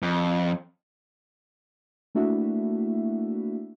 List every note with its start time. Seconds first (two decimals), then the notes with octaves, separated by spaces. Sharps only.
0.02 F2
2.15 A3 A#3 D4 E4 F#4 E5